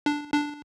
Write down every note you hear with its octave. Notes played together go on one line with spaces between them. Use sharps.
D4
D4